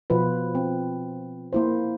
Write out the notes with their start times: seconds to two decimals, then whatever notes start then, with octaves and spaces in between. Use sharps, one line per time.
0.10 B2 F3 F4 B4
0.55 C4
1.53 A#3 E4 C5